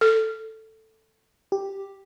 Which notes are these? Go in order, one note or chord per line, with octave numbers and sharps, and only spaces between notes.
A4
G4